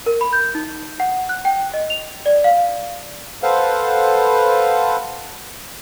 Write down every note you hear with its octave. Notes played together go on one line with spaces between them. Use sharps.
A#4
B5
G6
D#4
F#5
F#6
G5
D#5
F7
D5
F5
A4 B4 C5 F5 F#5